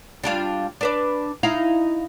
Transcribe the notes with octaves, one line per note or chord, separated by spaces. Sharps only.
G3 D4 F4
D4 B4 D5
D#4 E4 F5